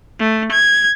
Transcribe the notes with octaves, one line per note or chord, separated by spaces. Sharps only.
A3
G#6